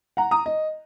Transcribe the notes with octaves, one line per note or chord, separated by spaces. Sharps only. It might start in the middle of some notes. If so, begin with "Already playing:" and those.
F#5 A#5
A#5 D#6
D#5